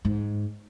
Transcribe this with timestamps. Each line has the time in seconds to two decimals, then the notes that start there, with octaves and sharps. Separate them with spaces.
0.05 G#2